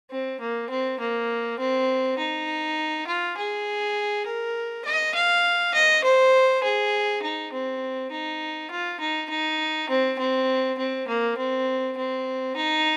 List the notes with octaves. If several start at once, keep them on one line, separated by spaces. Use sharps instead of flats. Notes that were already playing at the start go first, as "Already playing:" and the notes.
C4
A#3
C4
A#3
C4
D#4
F4
G#4
A#4
D#5
F5
D#5
C5
G#4
D#4
C4
D#4
F4
D#4
D#4
C4
C4
C4
A#3
C4
C4
D#4